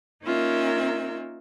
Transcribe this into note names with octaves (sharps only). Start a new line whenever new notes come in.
A#3 C#4 D#4 F4 A#4 E5